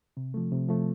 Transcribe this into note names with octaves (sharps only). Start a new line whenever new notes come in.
C3
F3 A3
C3
F3 A3